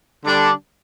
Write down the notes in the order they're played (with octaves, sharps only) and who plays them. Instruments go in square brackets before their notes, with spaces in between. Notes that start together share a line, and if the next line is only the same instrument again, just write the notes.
[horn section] D3 G3 D4